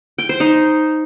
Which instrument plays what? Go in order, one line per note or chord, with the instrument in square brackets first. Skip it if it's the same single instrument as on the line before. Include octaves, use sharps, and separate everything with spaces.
[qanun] G5
C5
D#4